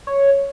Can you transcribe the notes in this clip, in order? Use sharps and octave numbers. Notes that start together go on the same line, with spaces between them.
C#5